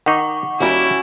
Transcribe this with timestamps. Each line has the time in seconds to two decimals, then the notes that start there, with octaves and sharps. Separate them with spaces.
0.06 D#3 D#4 F#5 C#6 D6
0.61 D#2 G3 C#4 E4 F#4 A#4 G5